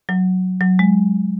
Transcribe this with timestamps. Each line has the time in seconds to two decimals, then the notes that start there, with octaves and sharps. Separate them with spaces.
0.09 F#3
0.61 F#3
0.79 G#3